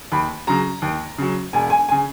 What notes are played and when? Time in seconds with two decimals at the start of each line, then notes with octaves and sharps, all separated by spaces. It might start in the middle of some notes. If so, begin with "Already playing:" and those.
0.12 D#2 B5
0.47 C#3 F#3 A#5
0.82 D#2
1.18 C#3 F#3
1.53 E1 G#5
1.70 G#5
1.89 C#3 G#5